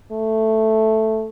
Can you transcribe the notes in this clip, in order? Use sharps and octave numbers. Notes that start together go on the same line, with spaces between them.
A3